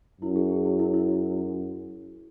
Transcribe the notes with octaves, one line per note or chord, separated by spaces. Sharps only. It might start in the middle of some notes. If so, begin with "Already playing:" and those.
F#2 E4
G#4
G#4
E4
E4
E4